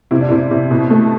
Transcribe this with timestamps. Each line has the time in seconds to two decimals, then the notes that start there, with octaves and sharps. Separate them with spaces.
0.11 C3 E4
0.21 D4
0.29 C3 E4
0.51 C3
0.71 B2
0.90 A3